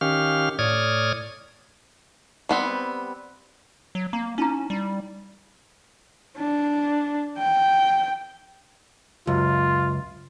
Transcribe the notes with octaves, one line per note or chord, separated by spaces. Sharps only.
D#3 C#4 G4 F5 F6
A2 C#5 D5 D#6 F6 G#6
G3 B3 C4
F#3
A#3 A#5
C#4 D#4 E4 A#5
G3
D4
G5
C#2 F#2 F4